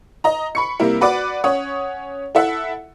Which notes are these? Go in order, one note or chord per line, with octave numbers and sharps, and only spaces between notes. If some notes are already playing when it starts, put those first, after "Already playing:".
D#5 A#5
B5 C#6 C#7
C3 G3 A#3 E4 A#4
F#4 B4 D5 F#5 B5 D6
C#4 C#5 F#5 D#6
E4 A4 E5 F#5